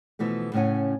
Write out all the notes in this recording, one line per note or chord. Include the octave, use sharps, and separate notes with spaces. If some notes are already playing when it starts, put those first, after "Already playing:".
B2 E3 F3 A3
A2 C#3 C#4 F#5 G#5